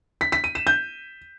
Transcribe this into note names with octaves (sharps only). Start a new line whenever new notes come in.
B6
B6
D#7
E7
G6